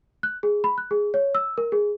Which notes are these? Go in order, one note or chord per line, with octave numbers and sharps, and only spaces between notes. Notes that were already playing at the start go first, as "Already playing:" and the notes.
F#6
G#4
B5
F#6
G#4
C#5
E6
A#4
G#4